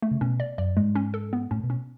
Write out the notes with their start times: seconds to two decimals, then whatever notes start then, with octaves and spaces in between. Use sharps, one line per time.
0.02 A3
0.11 C#3
0.21 B2 C#4
0.40 D5
0.58 F#2 D5
0.77 G#2 G#3
0.95 C#4
1.14 A4
1.33 B3
1.51 A2 C#4
1.63 B2
1.70 C#4